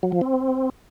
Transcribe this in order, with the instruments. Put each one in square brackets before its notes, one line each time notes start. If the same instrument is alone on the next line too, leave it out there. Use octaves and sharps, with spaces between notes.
[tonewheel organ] F#3
F3
C4